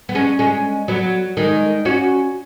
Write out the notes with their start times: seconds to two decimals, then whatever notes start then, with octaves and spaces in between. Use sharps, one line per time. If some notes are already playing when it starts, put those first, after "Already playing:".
0.09 B3
0.15 G#3 C#4
0.39 G#3 C#4
0.88 F#3 B3
1.37 D#3 G#3
1.85 C#4 F#4